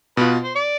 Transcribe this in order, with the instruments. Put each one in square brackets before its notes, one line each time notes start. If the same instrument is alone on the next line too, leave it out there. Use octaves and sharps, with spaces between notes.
[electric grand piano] B2 B3 F4 [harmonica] B4
[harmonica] C5
D5